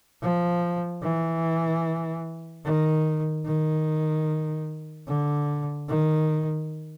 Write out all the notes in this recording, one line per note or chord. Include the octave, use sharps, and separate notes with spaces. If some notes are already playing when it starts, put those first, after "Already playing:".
F3
E3
D#3
D#3
D3
D#3